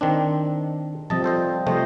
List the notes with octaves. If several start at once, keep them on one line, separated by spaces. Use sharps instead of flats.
D#3 C4 D4
C3 F3 G3 C4 D#5 A5
A4 C5 D#5
C3 F3 A3 C5 D#5